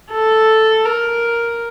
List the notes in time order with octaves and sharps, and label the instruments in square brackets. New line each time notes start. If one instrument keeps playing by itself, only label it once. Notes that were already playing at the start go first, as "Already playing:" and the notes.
[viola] A4
A#4